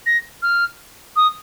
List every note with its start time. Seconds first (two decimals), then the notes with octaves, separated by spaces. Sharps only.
0.06 A#6
0.42 F6
1.16 D#6